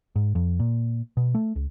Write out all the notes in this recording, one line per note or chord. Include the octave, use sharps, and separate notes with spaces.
G#2
F2
A#2
B2
A3
C#2